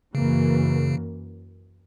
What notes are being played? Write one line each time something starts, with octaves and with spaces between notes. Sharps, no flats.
F#2 C#3 E3 A#3